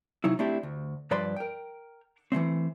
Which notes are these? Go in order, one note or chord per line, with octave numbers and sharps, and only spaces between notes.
C3 F#3 D#4 E4
A3 C4 D4 E4 G4
D2
G2 F3 B4 D5 B5 C6
A#4 G5
E3 F3 A3 C4